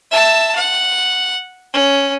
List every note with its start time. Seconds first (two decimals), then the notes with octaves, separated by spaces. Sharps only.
0.11 E5 A5
0.56 F#5
1.73 C#4